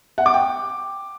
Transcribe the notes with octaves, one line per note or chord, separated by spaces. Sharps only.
F#5
D6
G5